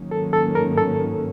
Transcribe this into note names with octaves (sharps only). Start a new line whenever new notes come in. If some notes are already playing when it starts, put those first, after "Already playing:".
Already playing: G#2 D#3 F#3 A#3 C#4
A4
A4
A#4
A4